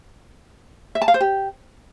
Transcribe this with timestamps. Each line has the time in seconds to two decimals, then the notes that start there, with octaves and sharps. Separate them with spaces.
0.95 E5
1.02 A5
1.08 F5
1.14 C5
1.20 G4